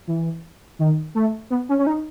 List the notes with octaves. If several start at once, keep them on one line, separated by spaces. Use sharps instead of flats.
E3
D#3
A3
B3
C#4
C#4
D#4